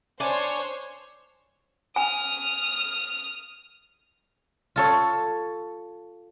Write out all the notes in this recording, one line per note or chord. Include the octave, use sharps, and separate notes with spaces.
D4 C5 C#5 G#5
G#5 D#6 F6
F4 A4 C#5